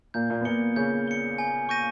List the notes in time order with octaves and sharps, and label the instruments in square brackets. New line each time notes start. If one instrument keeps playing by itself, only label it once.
[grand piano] A#2 A#3 [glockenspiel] G6
[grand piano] A#2 A#3
B3
[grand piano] A#2 A#3 [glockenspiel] C#7 G7
[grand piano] C#3 C#4 [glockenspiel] G6
[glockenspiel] C#7 G7
G#5
C#6 G6 A#6 D#7